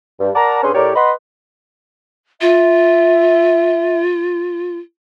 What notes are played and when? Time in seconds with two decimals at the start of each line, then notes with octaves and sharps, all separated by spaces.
0.20 G2
0.35 A#4 D5 F#5 A5 A#5
0.63 G2 C#4 D4 G#4 B4 C6
0.75 A2 G4 A#4 C#5 D5
0.96 B4 D#5 F#5 B5 C6
2.41 F4 E5